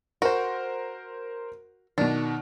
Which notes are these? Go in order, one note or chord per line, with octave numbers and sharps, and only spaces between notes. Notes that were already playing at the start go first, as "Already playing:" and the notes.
F#4 A#4 C5
B2 D#3 D4